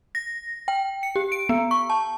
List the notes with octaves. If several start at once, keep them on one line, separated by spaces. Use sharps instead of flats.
A#6
G5
C#7
G4
D7
B3
C#6
A5